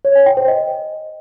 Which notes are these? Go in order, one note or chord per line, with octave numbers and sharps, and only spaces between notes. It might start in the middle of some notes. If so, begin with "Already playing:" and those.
C#5
G#5
G5
C5
D#5